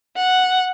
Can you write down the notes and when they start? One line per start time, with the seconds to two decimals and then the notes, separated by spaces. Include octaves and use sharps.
0.16 F#5